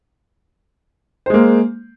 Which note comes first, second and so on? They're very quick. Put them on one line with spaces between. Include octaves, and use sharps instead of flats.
C5 G#3 A#3